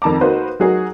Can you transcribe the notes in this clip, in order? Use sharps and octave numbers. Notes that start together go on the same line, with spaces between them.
F2 D#3 A5 A#5 D6
A#3 D#4 F#4 B4 C5
F#3 D#4 F#4 G#4 A#4